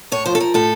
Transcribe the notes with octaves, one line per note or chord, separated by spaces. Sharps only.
A2 C#5
F3 C5
A4
F3 A#4
A2 A4